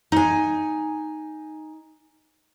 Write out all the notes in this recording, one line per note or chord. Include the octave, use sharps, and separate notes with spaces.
D#4 G#5